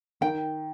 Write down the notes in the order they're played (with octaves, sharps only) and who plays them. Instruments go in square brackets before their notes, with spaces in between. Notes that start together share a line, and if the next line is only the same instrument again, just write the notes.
[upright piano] D#3 [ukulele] G5